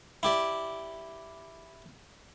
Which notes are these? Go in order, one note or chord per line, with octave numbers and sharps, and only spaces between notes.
E4 G4 D5